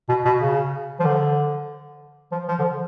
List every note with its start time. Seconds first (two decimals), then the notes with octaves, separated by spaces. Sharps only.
0.09 B2
0.25 B2
0.41 C#3
1.00 F3
1.05 D3
2.32 F3
2.48 F3
2.59 D3
2.63 F3